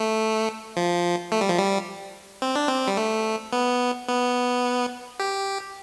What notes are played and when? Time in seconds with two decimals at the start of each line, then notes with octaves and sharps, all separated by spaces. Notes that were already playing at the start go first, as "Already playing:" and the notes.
Already playing: A3
0.77 F3
1.32 A3
1.41 G3
1.49 F3
1.58 G3
2.42 C4
2.55 D4
2.68 C4
2.88 G3
2.97 A3
3.53 B3
4.08 B3
5.20 G4